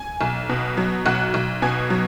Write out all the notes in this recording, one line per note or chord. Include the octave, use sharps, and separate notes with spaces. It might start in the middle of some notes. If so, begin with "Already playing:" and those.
Already playing: G#5
B1
B2
F#3
B1 F#5 F#6
B1
B2 G#5 G#6
F#3